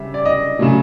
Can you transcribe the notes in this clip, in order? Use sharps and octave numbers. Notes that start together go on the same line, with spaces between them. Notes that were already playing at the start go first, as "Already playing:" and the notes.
Already playing: C#3 G3 E5
D5
D#5
C#3 F#3 A3